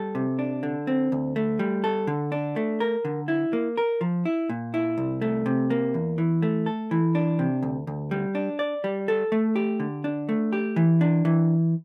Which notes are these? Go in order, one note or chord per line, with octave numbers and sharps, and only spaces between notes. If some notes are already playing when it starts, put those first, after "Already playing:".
Already playing: G3 A4
C3
D4
D3
C4
D2
A3
G3
A4
D3
D4
A3
A#4
D3
E4
A#3
A#4
F3
E4
A#2
E4
C2
A3
C3
A#3
E2
E3
A3
A4
E3
D4
C3
D2
D2
G3
D4
D5
G3
A4
A3
G4
D3
D4
A3
G4
E3
D4
E3